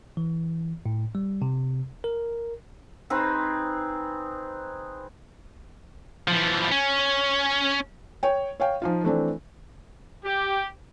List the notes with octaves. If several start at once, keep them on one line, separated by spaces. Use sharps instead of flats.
E3
A2
G3
C3
A#4
C4 D#4 G#4 B4
E3 F3
C#4
C#5 G5
C#5 F5 G5
F3 D#4 F4
E3 A3 C4 D4
G4